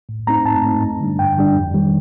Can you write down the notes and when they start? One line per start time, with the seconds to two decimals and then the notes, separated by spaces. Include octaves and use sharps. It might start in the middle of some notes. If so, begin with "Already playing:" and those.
0.09 A2
0.27 A3 C4 D#4 A#5
0.45 A2 A5
0.64 A3 C4 D#4
0.82 G2
1.00 D3 G3 D4
1.18 G2 G5
1.37 D3 G3 D4
1.56 F2
1.74 D#3 G3